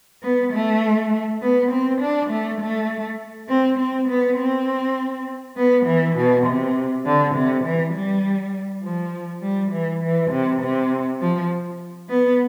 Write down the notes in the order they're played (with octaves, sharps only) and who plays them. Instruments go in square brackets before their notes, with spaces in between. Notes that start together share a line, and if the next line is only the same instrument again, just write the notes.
[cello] B3
A3
B3
C4
D4
A3
A3
C4
C4
B3
C4
B3
E3
B2
C3
D3
C3
E3
G3
F3
G3
E3
E3
C3
C3
F3
B3